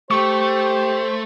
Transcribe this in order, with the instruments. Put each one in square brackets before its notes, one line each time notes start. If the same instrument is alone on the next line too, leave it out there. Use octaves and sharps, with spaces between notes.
[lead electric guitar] A3 [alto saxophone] G4 [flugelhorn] C5 [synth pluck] C#6